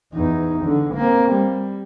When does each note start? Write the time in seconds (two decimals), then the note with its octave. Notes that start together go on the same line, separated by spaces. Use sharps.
0.14 E2 D#4
0.65 D3
0.94 A#3 C4
1.32 G3